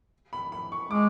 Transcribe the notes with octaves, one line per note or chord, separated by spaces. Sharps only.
B5
B5
C#6
G#3 D6